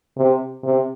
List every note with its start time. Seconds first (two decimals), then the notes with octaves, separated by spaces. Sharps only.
0.17 C3
0.64 C3